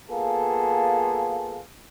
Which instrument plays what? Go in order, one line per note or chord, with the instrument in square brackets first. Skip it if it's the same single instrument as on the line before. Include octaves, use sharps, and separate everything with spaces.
[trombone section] A#3 B3 F4 G#4 A4